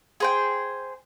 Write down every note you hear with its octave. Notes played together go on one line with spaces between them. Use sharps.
G#4 C5 G5